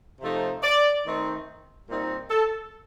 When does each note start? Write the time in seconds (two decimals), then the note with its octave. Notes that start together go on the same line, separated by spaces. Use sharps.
0.21 C3 F3 A3 D#4
0.63 D5
1.05 D#3 A3 C4 D#4
1.88 A#2 G3 C4 D#4
2.30 A4